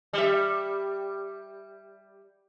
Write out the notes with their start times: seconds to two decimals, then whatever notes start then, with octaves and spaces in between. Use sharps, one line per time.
0.13 G3 E5